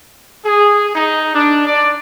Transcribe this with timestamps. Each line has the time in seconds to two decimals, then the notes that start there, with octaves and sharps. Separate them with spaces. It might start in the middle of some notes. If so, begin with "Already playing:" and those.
0.44 G#4
0.95 D#4
1.35 D4
1.67 D5